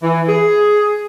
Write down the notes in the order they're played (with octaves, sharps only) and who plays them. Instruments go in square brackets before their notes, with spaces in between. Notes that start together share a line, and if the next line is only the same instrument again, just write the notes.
[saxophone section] E3
G#4